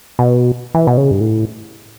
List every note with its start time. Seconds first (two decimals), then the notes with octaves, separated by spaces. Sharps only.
0.19 B2
0.74 E3
0.87 B2
0.97 C#3
1.11 G2
1.21 A2